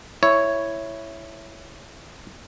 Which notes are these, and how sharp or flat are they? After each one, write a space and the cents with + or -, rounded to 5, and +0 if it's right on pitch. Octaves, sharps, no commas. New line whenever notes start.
E4 +5 C#5 +0